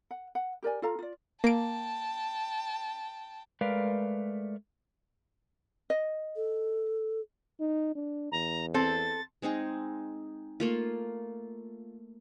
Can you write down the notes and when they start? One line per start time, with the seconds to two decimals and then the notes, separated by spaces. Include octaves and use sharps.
0.11 F#5
0.35 F#5
0.63 G4 A#4 D5 G#5
0.82 F4 A4 F5 A#5
0.99 F4 D5
1.44 A#3 G5 A5 D7
3.61 G#3 A3 A#4 B4 D5 F5
5.90 D#5
6.36 A4
7.60 D#4
7.95 D4
8.32 E2 A#5
8.74 C4 A4 A6
9.42 G#3 C4 D#4 G#4
10.60 A3 A#3 F4